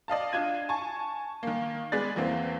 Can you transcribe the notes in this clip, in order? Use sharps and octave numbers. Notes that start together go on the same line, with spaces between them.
D5 D#5 F5 A5
D4 F4 G#6 D#7
G#5 A5 C#6
D#3 A#3
G#3 B3 G#4 B4 D5 A6
E2 E3 A#3 C4